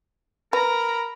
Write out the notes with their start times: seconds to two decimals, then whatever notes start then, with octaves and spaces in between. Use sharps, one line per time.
0.53 A#4 B4 A#5 B5